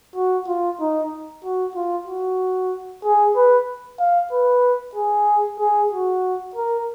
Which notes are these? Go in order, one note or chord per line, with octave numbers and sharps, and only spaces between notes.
F#4
F4
D#4
F#4
F4
F#4
G#4
B4
F5
B4
G#4
G#4
F#4
A#4